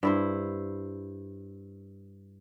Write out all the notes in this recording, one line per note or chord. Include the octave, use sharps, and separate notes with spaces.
G2 E4 C5